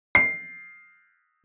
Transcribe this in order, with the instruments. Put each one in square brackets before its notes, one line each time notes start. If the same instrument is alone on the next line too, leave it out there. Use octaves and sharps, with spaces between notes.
[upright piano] C7